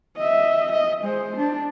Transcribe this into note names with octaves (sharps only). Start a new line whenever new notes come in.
D#5 E5
D#5
G#3 C5
D4